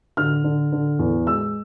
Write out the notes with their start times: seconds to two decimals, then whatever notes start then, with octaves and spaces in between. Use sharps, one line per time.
0.17 D3 F6
0.44 D3
0.72 D3
0.99 E2
1.26 G#3 E6